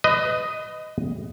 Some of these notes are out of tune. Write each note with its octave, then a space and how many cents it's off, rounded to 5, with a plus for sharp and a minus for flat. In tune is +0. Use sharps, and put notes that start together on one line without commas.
B4 +30 D#5 +0